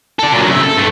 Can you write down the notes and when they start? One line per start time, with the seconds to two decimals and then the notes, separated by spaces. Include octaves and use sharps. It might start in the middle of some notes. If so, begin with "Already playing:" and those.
0.19 A4 D5
0.32 A#2 F#3
0.48 C#3 E5
0.63 A4
0.77 G2 A3